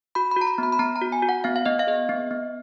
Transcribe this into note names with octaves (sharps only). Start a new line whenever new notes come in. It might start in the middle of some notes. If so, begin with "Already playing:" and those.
F#4 B5
B5
F#4 A#5
B5
B3 B5
B5
B3 A#5
A#5
F#4
G#5
F#4
F#5
B3 F5
F5
B3 D#5
F5
G#4 D#5
B3
B3